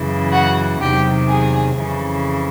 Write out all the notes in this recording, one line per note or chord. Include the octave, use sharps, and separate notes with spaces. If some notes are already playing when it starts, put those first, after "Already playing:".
Already playing: F#2 C#3 E3
F#4 F#5
E2 C3 D#3 F#3 G4 G5
G#4 G#5
F2 C#3 E3